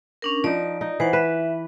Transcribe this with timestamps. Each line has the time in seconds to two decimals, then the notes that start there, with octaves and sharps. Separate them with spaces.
0.22 C#4 D4 A#4
0.44 F3 D#4 D5
0.81 D#4
1.00 E3 C5 F#5
1.13 B4 E5